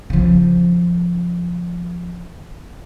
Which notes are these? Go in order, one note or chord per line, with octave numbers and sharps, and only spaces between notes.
C#3 F3